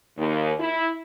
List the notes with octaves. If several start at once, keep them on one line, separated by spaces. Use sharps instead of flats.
D#2
E4